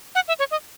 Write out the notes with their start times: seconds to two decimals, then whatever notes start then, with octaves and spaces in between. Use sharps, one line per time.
0.15 F#5
0.28 E5
0.39 C#5
0.51 D#5